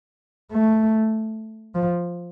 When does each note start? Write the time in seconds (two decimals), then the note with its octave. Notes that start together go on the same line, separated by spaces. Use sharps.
0.52 A3
1.75 F3